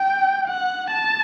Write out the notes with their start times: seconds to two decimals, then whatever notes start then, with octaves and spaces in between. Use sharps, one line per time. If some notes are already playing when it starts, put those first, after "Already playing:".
Already playing: G5
0.48 F#5
0.91 A5